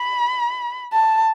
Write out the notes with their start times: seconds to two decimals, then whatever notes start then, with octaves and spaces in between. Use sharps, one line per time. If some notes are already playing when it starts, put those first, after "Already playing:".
Already playing: B5
0.93 A5